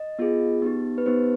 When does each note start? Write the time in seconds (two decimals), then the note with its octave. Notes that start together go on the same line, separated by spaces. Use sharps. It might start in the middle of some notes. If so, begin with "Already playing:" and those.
Already playing: D#5
0.19 B3 F4 G#4
0.62 B3 D#4 G4
0.98 B4
1.06 B3 D#4 G4 C5